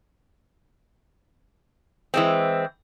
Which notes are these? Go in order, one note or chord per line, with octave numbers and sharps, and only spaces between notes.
E3 G#3 C4